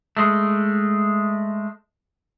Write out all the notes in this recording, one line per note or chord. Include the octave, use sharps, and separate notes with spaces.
G#3 A3